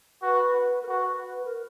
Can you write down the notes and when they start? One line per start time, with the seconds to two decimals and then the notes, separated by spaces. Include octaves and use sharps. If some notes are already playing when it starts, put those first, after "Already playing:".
0.22 F#4 B4
0.83 A#4
0.88 F#4 B4
1.45 A#4